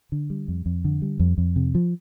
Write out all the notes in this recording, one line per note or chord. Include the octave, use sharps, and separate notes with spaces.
D3
G3
F2
F2
D3
G3
F2
F2
C3
F3